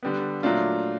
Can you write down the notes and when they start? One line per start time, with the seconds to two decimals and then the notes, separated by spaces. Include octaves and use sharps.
0.03 D3 G3 B3
0.43 A#2 F#3 A3 D4 F4